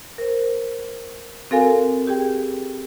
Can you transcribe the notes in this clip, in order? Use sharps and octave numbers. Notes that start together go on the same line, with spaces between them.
A#4 C5
C4 F#4 A4 A#4 F5 G#5
G4 G#4 G5